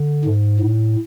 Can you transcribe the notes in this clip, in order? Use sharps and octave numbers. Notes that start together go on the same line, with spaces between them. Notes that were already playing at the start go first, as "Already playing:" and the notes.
Already playing: D3
G#2
A2